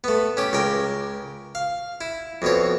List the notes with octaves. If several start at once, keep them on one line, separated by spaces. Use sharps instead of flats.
A3 B3
C#4 G4
C#2 A#4 G5
F5
E4
F2 B2 C#5